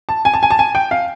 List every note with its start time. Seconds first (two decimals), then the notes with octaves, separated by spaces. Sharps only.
0.09 A5
0.25 G#5
0.34 A5
0.43 G#5
0.51 A5
0.59 G#5
0.75 G5
0.91 F5